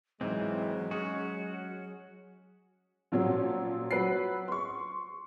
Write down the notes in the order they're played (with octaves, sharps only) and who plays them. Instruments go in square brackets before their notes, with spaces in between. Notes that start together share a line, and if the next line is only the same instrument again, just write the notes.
[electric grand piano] G#2 [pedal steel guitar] E3 C4 [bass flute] F#3 [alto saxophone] G#3
[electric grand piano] C#4 G#4 [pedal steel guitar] F#4
[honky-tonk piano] A#2 F3 F#3 C#4
F#3 B4 C7
C6 C#6